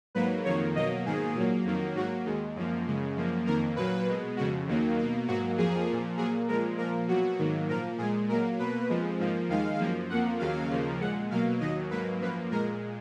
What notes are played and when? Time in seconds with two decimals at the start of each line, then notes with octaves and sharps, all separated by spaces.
0.15 G#2 F#3 A#3 B4
0.45 F2 D#3 A#3 C#5
0.76 B2 F#3 A#3 D#5
1.06 G#2 D#3 A#3 G#4
1.35 A#2 F#3 A#3
1.65 F2 D#3 F#3 A#3
1.95 G#2 F#3 A#3 F#4
2.25 D#2 D#3 G#3
2.56 F#2 F3 A#3
2.87 F#2 C#3 G#3
3.16 F#2 F3 A#3
3.46 F2 D#3 A#3 A#4
3.76 A#2 F#3 A#3 B4
4.07 B2 G#3
4.36 F2 C#3 G#3 F#4
4.67 D#2 D#3 F#3 A#3
4.98 B2 A#3
5.28 G#2 F#3 A#3 F#4
5.57 F2 F3 A#3 G#4
5.88 A#2 F3 A#3
6.17 A#2 F#3 A#3 G#4
6.48 A#2 F3 G#3 A#4
6.78 A#2 F3 A#3 A#4
7.08 B2 F#3 A#3 F#4
7.38 G#2 D#3 F#3 A#3
7.68 A#2 F3 A#3 A#4
7.98 A#2 G#3 G#4
8.28 A#2 F#3 A#3 A#4
8.59 B2 A#3 B4
8.89 F2 F3 G#3
9.19 G#2 F3 A#3
9.49 D#2 D#3 G#3 F5
9.79 F#2 F3 A#3
10.10 F2 F3 A#3 F#5
10.39 D#2 C#3 F#3 A#3 F5
10.70 D#2 C#3 F3 A#3
11.01 A#2 G#3 F#5
11.30 B2 F#3 A#3 F5
11.60 D#2 D#3 F#3 D#5
11.91 G#2 F#3 A#3 B4
12.21 F#2 F3 A#3 B4
12.51 A#2 G#3 A#4